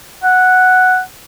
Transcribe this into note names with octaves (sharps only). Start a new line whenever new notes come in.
F#5